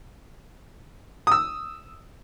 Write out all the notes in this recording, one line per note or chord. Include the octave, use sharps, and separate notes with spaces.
D#6 E6